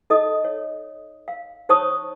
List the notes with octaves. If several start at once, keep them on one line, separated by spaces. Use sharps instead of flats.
D#4 A4 D#5 D#6
C#5
F5
D#4 C5 C#5 A5 C#6 D#6